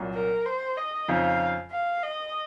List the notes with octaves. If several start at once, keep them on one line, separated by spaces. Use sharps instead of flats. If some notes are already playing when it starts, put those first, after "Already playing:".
Already playing: C2 A#2 F#3
A#4
C5
D#5
F2 C#3 F3 C4 D#4 F5
F5
D#5